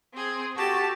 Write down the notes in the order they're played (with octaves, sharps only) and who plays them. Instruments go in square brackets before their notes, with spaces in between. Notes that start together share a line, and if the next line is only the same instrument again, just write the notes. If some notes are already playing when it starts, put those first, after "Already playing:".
[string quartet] C4 G#4
F#4 G4 A4 A5